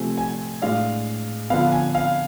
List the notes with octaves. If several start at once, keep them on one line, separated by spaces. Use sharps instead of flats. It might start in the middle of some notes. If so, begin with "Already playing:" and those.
Already playing: C3 F3 A3 C4 G#5
G#5
A2 G#3 D4 F5
D3 F3 B3 F5
G#5
F5